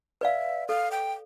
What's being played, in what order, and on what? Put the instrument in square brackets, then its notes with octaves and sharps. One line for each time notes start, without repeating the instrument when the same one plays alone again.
[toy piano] B4 D5 F5 [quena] E5
[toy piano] A4 [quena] F5
[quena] G5